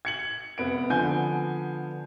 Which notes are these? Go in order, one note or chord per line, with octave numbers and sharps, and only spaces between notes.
G#6 C#7 F#7
F1 B3 D7
D3 F3 B3 G#5 G6